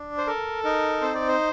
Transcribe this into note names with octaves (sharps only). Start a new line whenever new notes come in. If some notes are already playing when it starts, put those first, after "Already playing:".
Already playing: D4
C5
A4 A#4
D#4 A#4
C4 C5
D5
C5